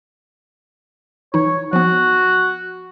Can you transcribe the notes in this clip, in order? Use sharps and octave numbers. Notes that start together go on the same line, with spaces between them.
E3 D#4 C#5
F3 B3 F#4